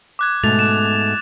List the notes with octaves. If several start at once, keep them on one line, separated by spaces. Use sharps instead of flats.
D6 F#6 G#6
G#2 B2 A3 A6 F7
E7